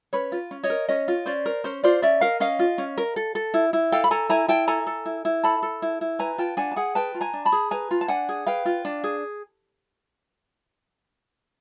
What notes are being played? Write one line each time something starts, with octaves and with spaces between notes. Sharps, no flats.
C#4 B4 C#5
F4
C#4
C#5 D#5
A#4
C#4 C#5 D#5
F4
C#4 C5 D5
A#4
C#4 C5
F4 C5 D5
C#4 D5 E5
A#4 D#5 F5
C#4 D#5 F5
F4
C#4
A#4
A4
A4
E4
E4
A4 F5 G5
B5
A4 G#5 A#5
E4 G#5 A#5
E4 G5 A5
A4 G#5 A#5
A4
E4
E4
A4 A5 B5
A4
E4
E4
B4 G#5 A#5
F4 G5 A5
D4 F#5 G#5
A5
G#4 F#5 G#5
B4 G5 A5
F4
G#5 A#5
D4
A5 B5
G#4
B4 G#5 A#5
F4
A5
D4 F#5 G#5
G#4
B4 F5 G5
F4
D4
G#4